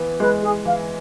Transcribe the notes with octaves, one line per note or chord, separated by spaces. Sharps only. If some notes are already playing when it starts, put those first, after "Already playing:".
Already playing: E3 B3
G#3 B4
G#4
E3 F5